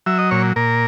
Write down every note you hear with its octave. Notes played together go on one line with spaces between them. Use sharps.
F#3 E5
D#5
A#2 C#5
A#2 A#4